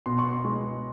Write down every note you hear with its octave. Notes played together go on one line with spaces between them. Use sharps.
B2 C6
C#6
B3
C6
G#3